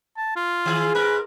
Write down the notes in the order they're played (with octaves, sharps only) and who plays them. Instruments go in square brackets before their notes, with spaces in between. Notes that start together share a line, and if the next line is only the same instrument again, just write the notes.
[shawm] A5
F4
[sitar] D#3 G#4
[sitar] G#2 A#4 [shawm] B4